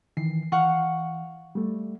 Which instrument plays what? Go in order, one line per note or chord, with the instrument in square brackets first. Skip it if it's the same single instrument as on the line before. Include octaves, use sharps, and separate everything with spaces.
[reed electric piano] D#3 E3 [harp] C7
[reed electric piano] E3 [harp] F5 F#5 C#6
[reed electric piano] G3 A3